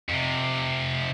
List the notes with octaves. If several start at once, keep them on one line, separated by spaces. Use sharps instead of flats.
F2 C3